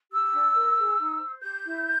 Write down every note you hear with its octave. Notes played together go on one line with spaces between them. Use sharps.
G4 E6
D4
A#4
G#4
D#4
C5
G4 G6
E4